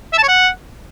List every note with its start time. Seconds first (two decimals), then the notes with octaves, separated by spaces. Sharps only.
0.13 E5
0.18 A5
0.23 C#5
0.28 F#5